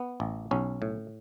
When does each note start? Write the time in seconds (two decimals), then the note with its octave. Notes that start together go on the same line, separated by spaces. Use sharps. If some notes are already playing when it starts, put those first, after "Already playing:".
Already playing: B3
0.20 A1
0.51 B1 C#4
0.82 A2